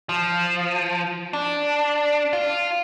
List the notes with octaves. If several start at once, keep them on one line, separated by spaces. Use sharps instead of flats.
F3
D4
F4